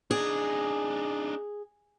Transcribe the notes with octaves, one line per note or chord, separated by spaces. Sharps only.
D4 D#4 G#4